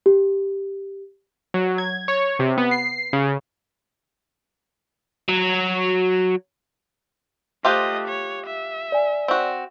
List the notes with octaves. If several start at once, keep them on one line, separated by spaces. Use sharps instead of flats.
G4
F#3
G#6
C#5
C3
B3
C7
C#3
F#3
A3 F4 G4 C5 D#5 D6 F#6
C#5
E5
D5 G#5
C4 F#4